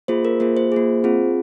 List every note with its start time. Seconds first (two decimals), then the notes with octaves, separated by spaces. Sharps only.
0.08 A#3 F4 G#4 C5
0.25 A#4
0.40 A#3 F4 G#4 C5
0.57 C5
0.72 A#3 F4 G#4
1.04 C4 F4 G#4